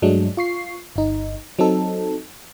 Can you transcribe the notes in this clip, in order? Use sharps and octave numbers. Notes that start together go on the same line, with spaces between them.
G2 F#3 G#3 A3 D4
F4 C#6 C7
G1 D#4
F#3 C4 D#4 A4